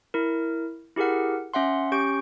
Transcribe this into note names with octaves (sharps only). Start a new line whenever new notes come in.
E4 A#4
E4 G4 G#4 A#4 F#5
C#4 E5 F#5 C6
C#4 G4 C#6 G6 D7